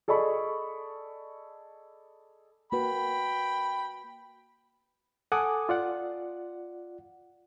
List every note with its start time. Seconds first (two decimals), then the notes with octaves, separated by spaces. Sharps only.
0.08 G#4 A4 D5 D#5 B5 C#6
2.72 A#3 F#4 B4 G5 B5
5.32 A4 F#5 G#5 D6 D#6
5.69 F4 D5 F#5